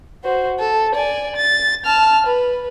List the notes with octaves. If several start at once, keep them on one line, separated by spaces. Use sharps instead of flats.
F#4 C5
A4
D5 G#5
A6
A5 F6
B4